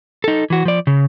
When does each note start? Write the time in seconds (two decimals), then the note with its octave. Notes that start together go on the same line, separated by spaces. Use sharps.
0.24 D#4 A4
0.50 E3 F#4
0.65 F3 D5
0.87 C#3